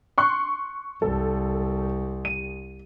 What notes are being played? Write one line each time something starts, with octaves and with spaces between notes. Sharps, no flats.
C6 C#6 F#6
C2 A4
D#7